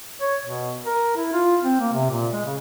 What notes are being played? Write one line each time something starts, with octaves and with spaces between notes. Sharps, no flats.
C#5
B2
A#4
E4
F4
C4
A#3
C3
A#2
G#3
C#3